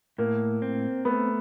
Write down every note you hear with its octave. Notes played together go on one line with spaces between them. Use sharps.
A2 A#3
C4
A3 B3